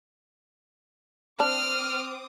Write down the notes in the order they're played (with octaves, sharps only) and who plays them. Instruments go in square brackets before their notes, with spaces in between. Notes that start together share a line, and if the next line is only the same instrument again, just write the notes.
[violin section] C4 D6 D#6 [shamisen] D4 [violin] F6